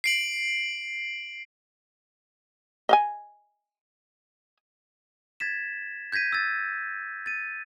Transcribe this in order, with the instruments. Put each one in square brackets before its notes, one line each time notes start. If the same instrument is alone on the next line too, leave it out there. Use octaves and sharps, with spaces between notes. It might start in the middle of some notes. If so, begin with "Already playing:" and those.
[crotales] C7 D7 F#7
[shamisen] D#5 F5 G#5
[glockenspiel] G#6 A6 B6 E7
G6 G#6 A#6 B6 D#7
E6 A6
A6 D#7